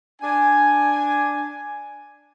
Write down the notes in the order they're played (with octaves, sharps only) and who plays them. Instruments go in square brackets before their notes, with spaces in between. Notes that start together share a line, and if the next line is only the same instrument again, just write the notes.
[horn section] D4 G#5